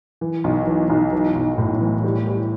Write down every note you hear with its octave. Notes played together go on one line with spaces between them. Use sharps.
E3
B1
E3
B1
E3
B1
A2
E3
G3
G3